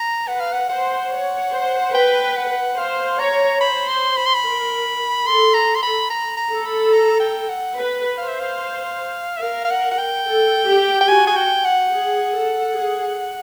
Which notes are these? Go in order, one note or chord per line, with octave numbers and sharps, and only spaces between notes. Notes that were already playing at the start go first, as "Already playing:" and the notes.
Already playing: A#5
B4 F#5
F5
F#5
C5 F#5
C#5
C5
B4 G5
F#5
C5 F5
C#5 A#5
C5 B5
C6
B5
C6
B5
A#4
A4 C6
A#5
C6
B5
A#5
A#5
A4
B5
A#5
G5
F#5
B4
C5 F5
E5
F5
E5
A#4 F5
F5
F#5
F#5
G5
A4
G4
G5
F#4 G#5
G#5
G5
F#5
G#4
A4
G#4